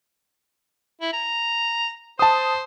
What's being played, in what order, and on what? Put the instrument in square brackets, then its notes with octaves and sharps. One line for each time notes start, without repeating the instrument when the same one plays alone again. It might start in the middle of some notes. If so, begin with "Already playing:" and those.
[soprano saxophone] E4
A#5
[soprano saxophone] C5 [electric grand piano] A5 D#6